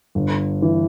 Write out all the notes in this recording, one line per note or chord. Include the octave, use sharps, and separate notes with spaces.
G1
E3